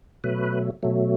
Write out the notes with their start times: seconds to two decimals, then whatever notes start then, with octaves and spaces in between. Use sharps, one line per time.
0.24 B2 F#3 A3 B4
0.83 B2 F#3 A3